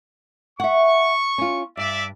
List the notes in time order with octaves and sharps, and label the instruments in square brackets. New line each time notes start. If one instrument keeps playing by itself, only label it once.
[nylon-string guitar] E5 F#5 [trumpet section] C#6
[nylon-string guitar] C#4 F4
[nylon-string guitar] G2 [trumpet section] D5 E5